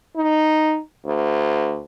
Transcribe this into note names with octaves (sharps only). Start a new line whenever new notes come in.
D#4
D2